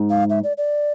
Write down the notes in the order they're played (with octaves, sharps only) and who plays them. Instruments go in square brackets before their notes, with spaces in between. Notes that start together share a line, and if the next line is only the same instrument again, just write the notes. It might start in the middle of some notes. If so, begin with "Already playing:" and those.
Already playing: [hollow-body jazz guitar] G#2
[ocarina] F5
E5
D5
D5